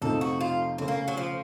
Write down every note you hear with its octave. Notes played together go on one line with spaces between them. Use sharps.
F2 C3 F3 A3 D#4 A4
F#4
F4
C#3 A3 C4 C#4
A#3
F#3
F3